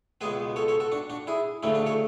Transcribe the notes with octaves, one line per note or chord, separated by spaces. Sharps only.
C#2 B2 G#3 B3 G#4 B4
A4 C#5
A4 C#5
F#4 A4
D4 F#4
D4 F#4
E4 G#4
D2 C#3 F#3 A3 C#4 E4
D4 F#4
A4 C#5